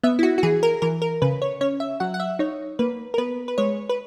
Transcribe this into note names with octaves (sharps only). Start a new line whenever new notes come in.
B3 E5
E4
F#4
F#4
E3 G#4
A#4
E3 A#4
A#4
C#3 B4
C#5
C#4 C#5
E5
F#3 F#5
F#5
E5
D#4 C#5
A#3 B4
A#4
B3 B4
B4
G#3 C#5
B4